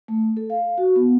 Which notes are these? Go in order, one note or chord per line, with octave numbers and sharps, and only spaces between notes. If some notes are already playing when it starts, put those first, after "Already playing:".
A3
A4
F5
F#4
B3